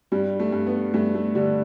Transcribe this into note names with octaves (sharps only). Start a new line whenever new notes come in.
G2 G3
A3
G2
B3
G2 A3
A3
D3 G3